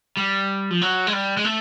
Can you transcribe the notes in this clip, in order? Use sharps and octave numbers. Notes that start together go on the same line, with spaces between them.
G3
F3
F#3
G#3
G3
G#3
A3